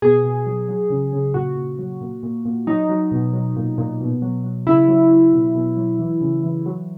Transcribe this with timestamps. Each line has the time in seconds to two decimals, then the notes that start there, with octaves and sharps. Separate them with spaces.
0.02 B2 G#4
0.24 B2
0.46 F#3
0.68 F#3
0.90 C#3
1.13 C#3
1.34 A#2 F#4
1.56 A#2
1.79 F#3
2.01 A#2
2.23 A#2
2.45 A#2
2.67 F#3 D#4
2.89 F#3
3.12 B2
3.33 F#3
3.56 A#2
3.78 A#2
4.00 B2
4.22 F#3
4.44 F#3
4.67 C#3 E4
4.88 F#3
5.10 F#3
5.33 B2
5.55 B2
5.77 F#3
5.99 E3
6.21 C#3
6.43 E3
6.66 F#3